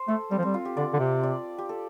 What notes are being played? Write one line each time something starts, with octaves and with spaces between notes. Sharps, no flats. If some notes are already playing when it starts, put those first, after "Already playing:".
Already playing: C5
A3 A4
G3 C4
F3
G3 C4
F4
G4
D3 D5
D3
C3
D5
G4
A4